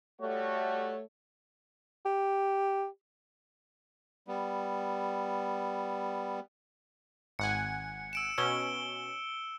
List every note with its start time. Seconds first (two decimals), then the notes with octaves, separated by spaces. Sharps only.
0.21 G3 A3 F#4 C#5
2.05 G4
4.28 G3 B3
7.39 G#1 F#5 G#5 C#7
8.13 E6 D7 E7
8.38 B2 C#4 E6 G7